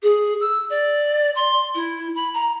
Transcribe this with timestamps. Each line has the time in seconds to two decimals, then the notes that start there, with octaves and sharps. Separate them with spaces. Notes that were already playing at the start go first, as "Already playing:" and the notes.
0.03 G#4
0.40 E6
0.69 D5
1.35 C6
1.75 E4
2.15 B5
2.34 A#5